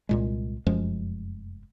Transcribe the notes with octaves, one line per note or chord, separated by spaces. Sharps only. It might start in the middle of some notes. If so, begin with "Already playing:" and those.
C2 A#2 G#3
F1 F#2 F3 G#3